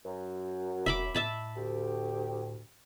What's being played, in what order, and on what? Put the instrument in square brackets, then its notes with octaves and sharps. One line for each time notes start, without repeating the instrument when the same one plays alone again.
[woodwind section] F#2
[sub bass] E1 [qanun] E5 B5 D6
[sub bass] A2 [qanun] E5 A5 B5
[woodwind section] D2 G4